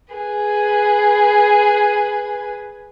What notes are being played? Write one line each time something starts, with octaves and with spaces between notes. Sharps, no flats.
G#4 B4